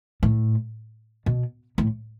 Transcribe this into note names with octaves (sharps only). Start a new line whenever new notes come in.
A2
B2
A2